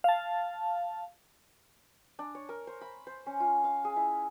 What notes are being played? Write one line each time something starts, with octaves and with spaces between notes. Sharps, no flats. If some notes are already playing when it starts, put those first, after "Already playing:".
F5 A5
D4
C#5
A#4
C5
B5
C5
C#4
F4
F5
G#4
E4